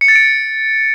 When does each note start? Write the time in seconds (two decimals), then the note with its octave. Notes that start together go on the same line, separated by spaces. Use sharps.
0.01 C#7
0.08 A6
0.16 D7